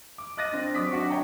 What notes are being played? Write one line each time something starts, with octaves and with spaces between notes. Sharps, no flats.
D6
D#5 F#6 A6 A#6 D#7
C4 D4
F#3 C4 D6 D#6 F#6 B6
D4 F#4 C#6
C#5 G5 A#5